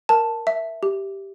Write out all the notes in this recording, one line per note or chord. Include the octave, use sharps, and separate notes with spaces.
A#4 A5
E5
G4